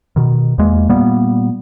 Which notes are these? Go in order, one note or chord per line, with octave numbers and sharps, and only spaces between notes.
B2 D#3
E2 G#3 A#3
A#2 G3 A#3 B3